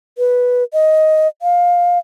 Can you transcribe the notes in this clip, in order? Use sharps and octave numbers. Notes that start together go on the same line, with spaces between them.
B4
D#5
F5